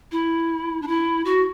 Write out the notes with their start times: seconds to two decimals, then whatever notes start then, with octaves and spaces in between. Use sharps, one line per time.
0.12 E4
0.82 D4
0.87 E4
1.25 F#4